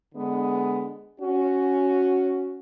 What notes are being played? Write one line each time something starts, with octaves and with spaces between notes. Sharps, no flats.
D3 G#3 B3
C#4 F#4